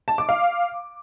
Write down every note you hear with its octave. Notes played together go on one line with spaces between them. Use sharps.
A5
D6
F5